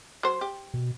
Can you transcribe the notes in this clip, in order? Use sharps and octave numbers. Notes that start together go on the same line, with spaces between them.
F#3 C5
G4
B2